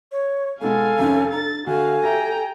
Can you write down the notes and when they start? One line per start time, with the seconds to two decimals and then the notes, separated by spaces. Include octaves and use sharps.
0.12 C#5
0.61 G#2 B2 G#3 A4 F5 G#5
0.99 F2 C3 D#3 C#4
1.32 D4 A#5 A6
1.67 D2 F#4 A4 F5 G#5
2.03 G4 E5 G5 A#5